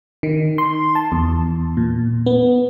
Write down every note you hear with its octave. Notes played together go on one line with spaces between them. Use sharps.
D#3
C6
A5
E2
A#2
B3